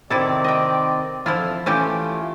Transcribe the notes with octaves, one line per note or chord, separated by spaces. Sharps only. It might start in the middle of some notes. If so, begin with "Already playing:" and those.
C3 D#3 C4 E4 A4 D5
D#5 G5
F2 D3 F3 E4 F4 A5
E3 A3 C#4 F4 G4